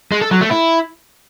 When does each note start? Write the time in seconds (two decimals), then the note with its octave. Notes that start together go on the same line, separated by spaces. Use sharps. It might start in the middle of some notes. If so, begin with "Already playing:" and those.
0.12 G#3
0.21 A4
0.31 F#3
0.41 A3
0.51 E4